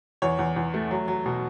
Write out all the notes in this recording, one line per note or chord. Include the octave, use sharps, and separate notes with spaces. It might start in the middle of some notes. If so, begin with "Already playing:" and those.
E2 C#5
E2
E2
A3
F#3
F#3
B2